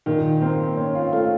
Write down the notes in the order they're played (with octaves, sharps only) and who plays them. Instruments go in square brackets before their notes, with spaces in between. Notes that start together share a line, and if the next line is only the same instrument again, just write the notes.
[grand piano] A#2 [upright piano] D#3
[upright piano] A#3 [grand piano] C4
[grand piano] C4 [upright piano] C#4
[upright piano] F4
[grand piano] A3 [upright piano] F4